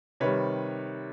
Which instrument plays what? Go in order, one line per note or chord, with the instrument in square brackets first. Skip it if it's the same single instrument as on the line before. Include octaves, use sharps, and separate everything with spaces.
[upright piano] C3 D#3 G3 B4 C#5